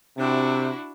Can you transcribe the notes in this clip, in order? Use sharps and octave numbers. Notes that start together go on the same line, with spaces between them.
C3 D4 E4 F#4